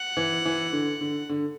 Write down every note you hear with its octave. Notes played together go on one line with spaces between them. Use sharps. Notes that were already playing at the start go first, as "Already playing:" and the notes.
Already playing: F#5
E3
E3
D3
D3
D3